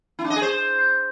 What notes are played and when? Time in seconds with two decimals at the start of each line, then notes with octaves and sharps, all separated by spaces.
0.19 E4
0.24 D4
0.30 D#5
0.36 G#4
0.42 C5